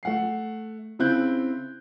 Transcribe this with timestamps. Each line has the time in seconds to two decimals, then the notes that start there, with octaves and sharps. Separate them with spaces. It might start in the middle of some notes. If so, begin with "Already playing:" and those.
0.03 A3 F#5 C7
0.99 C#3 C4 E4 F#6 G6